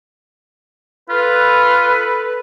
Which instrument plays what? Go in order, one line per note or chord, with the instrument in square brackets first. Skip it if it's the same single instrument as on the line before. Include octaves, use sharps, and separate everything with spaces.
[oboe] F4 [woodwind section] A4 B4